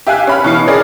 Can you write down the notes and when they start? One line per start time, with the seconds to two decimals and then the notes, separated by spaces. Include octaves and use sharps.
0.07 G4 E5 F5 G#5 F#6
0.27 C#4 B5 F6
0.44 B2 E3 C7
0.67 C#4 G#4 A#4 D5